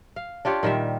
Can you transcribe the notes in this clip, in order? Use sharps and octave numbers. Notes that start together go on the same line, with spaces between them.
F5
D4 F4 G4 C#5
A#2 D#3 G3 E5